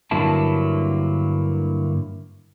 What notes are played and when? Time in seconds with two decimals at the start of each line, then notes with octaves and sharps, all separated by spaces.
0.11 G2 D3 F#3 A#3 E4 A5